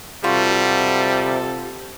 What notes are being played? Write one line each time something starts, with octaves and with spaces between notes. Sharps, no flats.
C3 G3 F4 F#4 A4